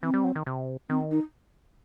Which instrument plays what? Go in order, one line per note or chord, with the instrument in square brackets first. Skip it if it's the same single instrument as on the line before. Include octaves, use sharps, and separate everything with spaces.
[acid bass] E3 [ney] C4
[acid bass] G3
F#3
D#3
C3
[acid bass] D#3 [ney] C4
[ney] D#4